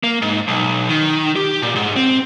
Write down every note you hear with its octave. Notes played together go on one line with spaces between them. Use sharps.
A#3
G#2
B1
D#3
G4
A#2
G#2
C4